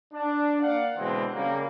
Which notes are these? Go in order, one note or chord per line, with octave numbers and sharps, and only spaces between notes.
D4
A#3 D5 F5 F#5
B2 D3 E3 G#3 C4
C#3 F#3 G3 A#3